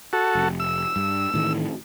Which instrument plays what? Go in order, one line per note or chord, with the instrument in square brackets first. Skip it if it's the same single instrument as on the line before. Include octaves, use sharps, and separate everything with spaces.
[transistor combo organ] F#4 A4
[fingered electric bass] F1
[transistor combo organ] E6
[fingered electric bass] G2
A2 D#3 E3